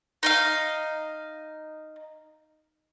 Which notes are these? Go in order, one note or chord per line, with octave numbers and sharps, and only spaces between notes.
D#4 D#5 F5